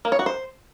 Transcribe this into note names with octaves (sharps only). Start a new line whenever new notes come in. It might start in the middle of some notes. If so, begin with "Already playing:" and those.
A#3
C#5
F#4
C5